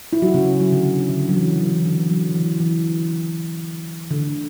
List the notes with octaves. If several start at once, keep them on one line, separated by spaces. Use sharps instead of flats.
E4
F#3 F#4
C#3 C#4
F#3
D3
D3
C#3
D3
F#3
E3
F#3
E3
D3
E3
F#3
E3
E3
D3